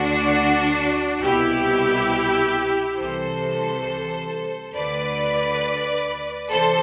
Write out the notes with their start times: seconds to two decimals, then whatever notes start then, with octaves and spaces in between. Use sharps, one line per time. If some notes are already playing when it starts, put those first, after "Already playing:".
Already playing: D2 D3 D4 F#4
1.22 C2 B2 E4 G4
2.98 C2 C3 E3 A4 C5
4.74 D2 D3 B4 D5
6.50 C3 E3 A4 C5